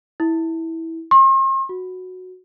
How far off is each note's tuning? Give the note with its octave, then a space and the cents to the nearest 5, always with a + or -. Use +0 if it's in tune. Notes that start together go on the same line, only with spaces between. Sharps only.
E4 -15
C6 +45
F#4 -10